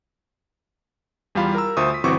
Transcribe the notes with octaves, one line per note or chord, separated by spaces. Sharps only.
E2 G3 F4 F5 B5
A#4 A#5 E6
D2 F4 C5 E5 C#6 D#6
D#6 B6
G1 E3 C4 F#4 C#6 D6